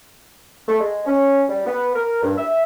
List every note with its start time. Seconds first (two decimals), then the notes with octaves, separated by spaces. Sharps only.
0.68 A3
0.80 G#3
1.06 C#4
1.49 G3
1.67 B3
1.94 A#4
2.23 G2
2.37 E5